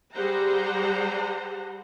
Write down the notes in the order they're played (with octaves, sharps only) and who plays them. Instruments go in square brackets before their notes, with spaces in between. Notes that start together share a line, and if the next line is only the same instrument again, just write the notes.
[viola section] G3 G4 G#4 C5 F#5 A#5